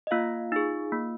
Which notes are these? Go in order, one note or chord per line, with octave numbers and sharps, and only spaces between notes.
D#5
A#3 F4 F5
D#4 G#4
A#3